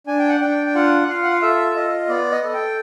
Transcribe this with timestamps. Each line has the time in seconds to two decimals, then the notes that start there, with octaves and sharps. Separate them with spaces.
0.07 D4 G#5
0.19 G5
0.29 F#5
0.41 D4 G5
0.66 G5
0.75 F4 F#5
1.08 F4 F5
1.24 F#5
1.32 F5
1.42 A4 E5
1.75 F4 D#5
2.09 B3 D5
2.32 D#5
2.44 A4
2.54 G5